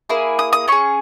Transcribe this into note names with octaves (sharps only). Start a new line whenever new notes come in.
A#3 E4 G#4
D#6
D#6
C#4 G#4 C#6